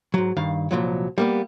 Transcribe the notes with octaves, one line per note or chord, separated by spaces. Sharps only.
G#2 F#3
G2 D#3 F5
C2 A#2 F3 F#3
G3 A#3 B3